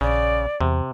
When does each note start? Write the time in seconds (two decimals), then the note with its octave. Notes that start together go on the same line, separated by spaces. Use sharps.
0.01 A#1 C#3 D5
0.61 E2 C3